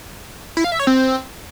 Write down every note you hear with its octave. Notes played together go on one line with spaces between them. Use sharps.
E4
F5
E5
C#5
C4